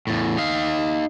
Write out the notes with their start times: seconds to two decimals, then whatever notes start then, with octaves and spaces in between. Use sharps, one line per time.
0.07 E2 A2
0.38 D#4 F5